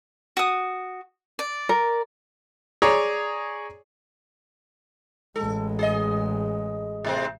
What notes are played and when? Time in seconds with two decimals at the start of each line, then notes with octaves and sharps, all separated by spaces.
0.37 F#4 D#6
1.39 D5
1.69 A#4
2.82 G#4 C#5 D5 A#5
5.36 A1 G#3 A4
5.79 G#4 D#5
7.05 A2 C3 C4